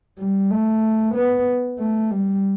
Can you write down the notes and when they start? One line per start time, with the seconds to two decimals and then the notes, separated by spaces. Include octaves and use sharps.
0.18 G3
0.50 A3
1.15 B3
1.79 A3
2.11 G3